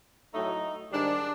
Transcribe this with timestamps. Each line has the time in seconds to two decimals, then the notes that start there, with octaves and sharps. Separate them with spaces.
0.33 A2 F#3 A3 D#4
0.92 G#2 D#3 G3 D4